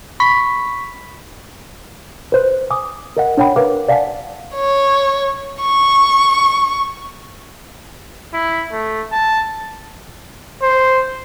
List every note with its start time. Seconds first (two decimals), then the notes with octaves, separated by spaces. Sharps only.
0.20 B5 C#6 B6
2.32 B4 C5 F#6
2.70 G#5 D6 D#6
3.17 A#4 D#5 F#5
3.37 D4 C#5 F#5 G5 B5
3.56 A#4 B4 F5 D6
3.88 D5 F5 F#5 G#5 A5 B6
4.55 C#5
5.61 C#6
8.33 E4
8.72 A3
9.12 A5
10.62 C5